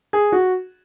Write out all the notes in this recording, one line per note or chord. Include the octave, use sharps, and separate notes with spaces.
G#4
F#4